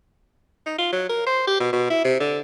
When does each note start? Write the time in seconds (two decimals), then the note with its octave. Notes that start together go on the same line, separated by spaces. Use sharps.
0.66 D#4
0.78 F4
0.93 F#3
1.09 A#4
1.26 C5
1.47 G4
1.60 B2
1.73 B2
1.90 E4
2.04 C3
2.20 D3